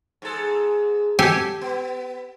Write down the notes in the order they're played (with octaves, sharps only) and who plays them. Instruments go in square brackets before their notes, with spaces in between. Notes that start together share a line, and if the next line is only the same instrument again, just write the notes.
[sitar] G#2 A4
[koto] G4 A4 G#5
[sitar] B3